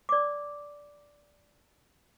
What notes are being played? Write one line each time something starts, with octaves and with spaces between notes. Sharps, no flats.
D5 D6